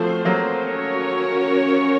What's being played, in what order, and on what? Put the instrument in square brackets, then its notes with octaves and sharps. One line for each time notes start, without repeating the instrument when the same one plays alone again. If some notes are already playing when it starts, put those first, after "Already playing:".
Already playing: [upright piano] F3 A3 [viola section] C4 F#4 C5
[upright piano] F#3 A#3
[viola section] C#4 F#4 A#4 C#5